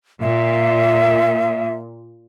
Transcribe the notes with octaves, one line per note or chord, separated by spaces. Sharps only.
A#2 E5